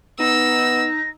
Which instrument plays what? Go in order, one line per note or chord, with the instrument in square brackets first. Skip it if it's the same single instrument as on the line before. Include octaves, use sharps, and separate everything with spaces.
[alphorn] B3 [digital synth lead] D#4 [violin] E6 [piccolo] A#6